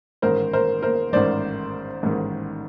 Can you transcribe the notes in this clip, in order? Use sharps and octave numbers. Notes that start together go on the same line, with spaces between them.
A1 G#2 D#3 A#4 C5
A#4 C5
A#4 C5
A1 G#2 D#3 C5 D5
A1 G#2 D#3